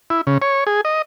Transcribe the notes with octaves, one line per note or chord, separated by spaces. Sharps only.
E4
C#3
C#5
G#4
D#5